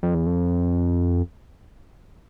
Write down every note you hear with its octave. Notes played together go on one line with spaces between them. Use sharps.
F2
E2
F2